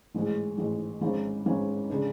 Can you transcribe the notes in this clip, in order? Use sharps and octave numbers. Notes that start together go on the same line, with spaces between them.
A1 G#2 G#3
A1 G#2 G#3
G#1 G#2 G#3 C#4
G#1 G#2 G#3 C#4
C#3 G#3 D4